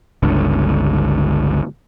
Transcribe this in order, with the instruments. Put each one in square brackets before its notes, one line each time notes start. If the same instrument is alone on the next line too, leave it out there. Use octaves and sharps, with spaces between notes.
[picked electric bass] G1 C#2 D3